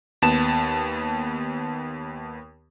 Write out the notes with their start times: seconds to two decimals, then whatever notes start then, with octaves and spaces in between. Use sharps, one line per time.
0.22 D#2 B3 A5 E7